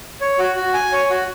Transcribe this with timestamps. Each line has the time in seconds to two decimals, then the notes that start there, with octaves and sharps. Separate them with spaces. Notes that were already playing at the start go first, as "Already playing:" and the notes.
0.21 C#5
0.39 F#4
0.56 F#4
0.74 G#5
0.92 C#5
1.10 F#4